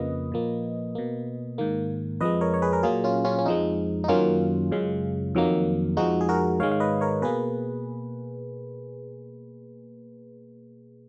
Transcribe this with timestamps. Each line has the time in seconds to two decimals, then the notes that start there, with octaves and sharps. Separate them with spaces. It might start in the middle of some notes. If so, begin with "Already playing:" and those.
Already playing: F2 C#3 F3 A#3 B4 D#5
0.32 A#2 F3 A#3
0.95 B2 A#3
1.58 G#2 D#3 A#3
2.20 F2 F3 G#3 B4 D#5
2.41 A#4 C#5
2.54 C#5
2.62 G#4 B4
2.73 A#4
2.83 A#2 F#3 A#3 F4 G#4
3.04 C#4 F4
3.24 C#4 F4
3.38 C#4
3.45 F2 F3 G#3 D#4
4.04 D#4
4.08 F#2 D#3 F#3 A#3 C#4 F4
4.71 F#2 C#3 G#3
5.35 F2 D#3 F#3 A#3
5.97 F2 F3 G#3 D#4 F#4
6.21 G#4
6.29 F#4 A#4
6.60 G#2 D#3 G#3 C#5 F5
6.72 F5
6.80 B4 D#5
7.01 A#4 C#5
7.22 B2 A#3 G#4 B4